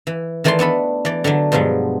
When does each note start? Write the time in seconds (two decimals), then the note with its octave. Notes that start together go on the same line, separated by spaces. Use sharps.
0.07 E3
0.44 D#3 E3 A3 D5 A5 C6
0.59 B3 D4 A4 B5
1.05 E3 D5
1.24 D3 F#3 A3 D4
1.52 G2 B2 F3 F#3 G#3